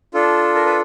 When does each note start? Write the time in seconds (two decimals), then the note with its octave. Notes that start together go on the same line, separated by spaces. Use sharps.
0.14 D4 F4 A4
0.55 A#4
0.66 B4